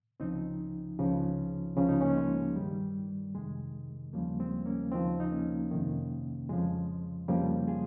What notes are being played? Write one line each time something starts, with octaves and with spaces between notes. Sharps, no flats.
C#2 C#3 F3 C4 D#4
C#2 C#3 F3
C#2 C#3 F3 C#4
D#4
A#3 C#4
G#3
G2 D#3 G3
F2 C3 D#3 G#3
D#2 C#3 F3 G3 A#3
G#3 C4
A#3 C#4
D#2 C#3 F3 C4 D#4
D#4
A#3 C#4
F2 C3 D#3
F2 C#3 F3 G#3
F2 C#3 F3 G3 A#3
F4 G#4